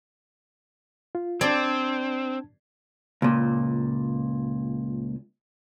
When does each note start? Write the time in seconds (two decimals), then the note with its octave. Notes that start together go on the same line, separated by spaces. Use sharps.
1.15 F4
1.41 C4 D4 D5 A5 G#6
3.22 C#2 A#2